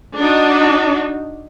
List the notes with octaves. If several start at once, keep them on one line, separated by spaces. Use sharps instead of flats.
D4 D#4 F#4